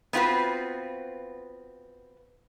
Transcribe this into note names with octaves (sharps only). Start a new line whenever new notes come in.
B3 C4 F4 F#4 B4